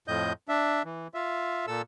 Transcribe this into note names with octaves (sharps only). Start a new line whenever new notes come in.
F2 A2 D#5 G6
D4 E5
E3
F4 E5
A#2 A4 E6